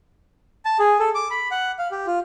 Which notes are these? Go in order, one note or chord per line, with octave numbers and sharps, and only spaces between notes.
A5
G#4
A4
D6
B5
F#5
F5
G4
F4